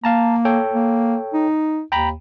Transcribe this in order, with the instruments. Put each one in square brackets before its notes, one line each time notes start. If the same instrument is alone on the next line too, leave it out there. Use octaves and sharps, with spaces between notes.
[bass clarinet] A#3 [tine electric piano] F5 A5 A#5
[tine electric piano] A4 C#5 G5
[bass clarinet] A#3
D#4
[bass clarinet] D#2 [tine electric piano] G5 A#5 B5